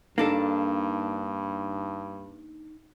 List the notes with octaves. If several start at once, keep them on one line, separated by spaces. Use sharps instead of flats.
G2 A#3 D4 D#4 A4